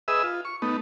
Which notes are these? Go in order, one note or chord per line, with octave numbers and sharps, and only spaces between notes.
G#4 B4 D#5 E5 E6
F4
C#6
A3 B3 D#4